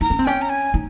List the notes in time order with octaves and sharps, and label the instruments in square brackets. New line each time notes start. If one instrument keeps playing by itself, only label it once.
[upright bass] D#4 [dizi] A#5
[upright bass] C#4
C4
[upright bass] C#4 [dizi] G5
[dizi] A#5
G#5
[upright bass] D#4